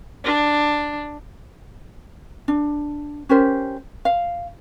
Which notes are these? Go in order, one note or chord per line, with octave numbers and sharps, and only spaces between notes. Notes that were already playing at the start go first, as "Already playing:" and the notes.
D4
D4
C#4 G4 A#4 C5
F5